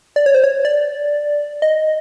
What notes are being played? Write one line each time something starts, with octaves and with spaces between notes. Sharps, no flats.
D5
C#5
C5
C#5
D5
D#5